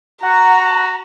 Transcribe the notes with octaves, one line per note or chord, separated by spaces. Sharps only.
F#4 F#5 A#5